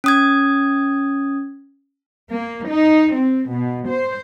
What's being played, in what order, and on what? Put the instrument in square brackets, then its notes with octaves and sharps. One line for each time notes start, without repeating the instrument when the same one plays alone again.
[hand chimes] C#4 D#6 G#6
[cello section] A#3
D#4
C4
B2
C5